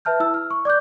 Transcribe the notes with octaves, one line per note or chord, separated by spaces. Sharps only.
B4 E5 A5 F6 G6
E4 E6
F6
C#6
D5 D6 F#6 G6